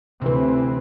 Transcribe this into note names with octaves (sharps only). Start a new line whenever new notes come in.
D2 C3 E3 C4 B4